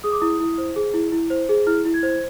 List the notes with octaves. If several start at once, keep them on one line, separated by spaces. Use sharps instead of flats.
G#4 D#6
D6
E4 D#6
E4
C5
G#4
E4
E4
C5
G#4
E4 F6
E4
G#6
C5